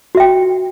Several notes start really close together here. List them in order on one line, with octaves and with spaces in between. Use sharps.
F#4 E5 G5